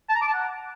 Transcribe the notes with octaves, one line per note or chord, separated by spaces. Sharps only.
A5
A#5
D6
A5
F#5